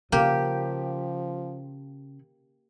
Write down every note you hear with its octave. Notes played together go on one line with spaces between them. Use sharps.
C#3 F3 A#3 G4